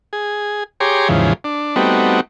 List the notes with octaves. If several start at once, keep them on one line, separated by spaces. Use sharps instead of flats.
G#4
G4 G#4 C#5 A#5 C6 D6
D#2 G#2 C#3 E3 F3
D4
G3 A3 B3 C4 D#4 F#4